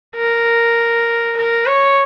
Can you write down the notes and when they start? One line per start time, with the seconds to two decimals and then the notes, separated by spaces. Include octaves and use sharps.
0.17 A#4
1.36 A#4
1.66 C#5